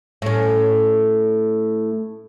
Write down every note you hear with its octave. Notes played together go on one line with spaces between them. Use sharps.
A2 C#4